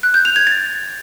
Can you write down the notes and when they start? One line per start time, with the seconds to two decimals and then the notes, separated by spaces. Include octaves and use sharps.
0.03 F#6
0.14 G6
0.25 F7
0.36 G#6
0.47 A6